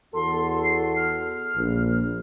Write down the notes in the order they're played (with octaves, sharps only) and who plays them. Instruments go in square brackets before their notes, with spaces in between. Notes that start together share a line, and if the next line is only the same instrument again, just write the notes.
[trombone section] E2 F#4 A4 [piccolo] C6
[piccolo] C7
F6
[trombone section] A#1